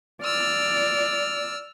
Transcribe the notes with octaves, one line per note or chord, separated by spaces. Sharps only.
D5 E6 F6